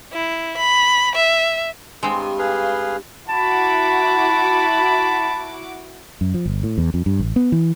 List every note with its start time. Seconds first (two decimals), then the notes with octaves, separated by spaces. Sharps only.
0.13 E4
0.57 B5
1.15 E5
2.03 G2 G#3 C4
2.39 G#4 B4 F5
3.29 E4 F#4 A5 B5 D6
6.21 F#2
6.34 F3
6.46 G1
6.63 A2
6.78 E2
6.94 F2
7.06 G2
7.19 A1
7.36 B3
7.52 E3